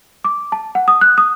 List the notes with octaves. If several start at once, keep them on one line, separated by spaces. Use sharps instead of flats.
D6
A5
F#5
D#6
F#6
D#6